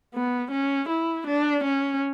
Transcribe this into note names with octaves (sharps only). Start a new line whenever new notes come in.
B3
C#4
E4
D4
C#4